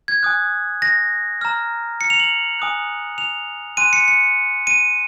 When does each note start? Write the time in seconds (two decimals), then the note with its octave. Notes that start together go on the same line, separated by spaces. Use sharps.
0.08 G#6
0.23 G#5 D#6 F#6
0.82 A#6
1.41 A#5 F6
2.01 C#7
2.10 F7
2.20 F#7
2.60 G#5 D#6 F#6
3.18 F7
3.77 G#5 C6 F#6 D#7
3.93 C#7
4.08 C#7
4.67 D#7